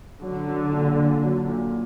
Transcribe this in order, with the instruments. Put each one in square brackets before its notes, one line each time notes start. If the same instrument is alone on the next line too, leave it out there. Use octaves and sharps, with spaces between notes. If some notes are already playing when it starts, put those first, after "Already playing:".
[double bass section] D3 [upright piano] F#3
[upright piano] F#3
A#2
A#2
F#3
A#2